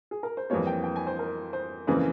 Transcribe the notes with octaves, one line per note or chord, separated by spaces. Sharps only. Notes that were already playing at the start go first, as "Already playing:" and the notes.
G#4
A#4
C5
F2 E3 G3 A#3 C#5
G5
G5
G#5
C5
A#4
C5
F2 C#3 E3 A#3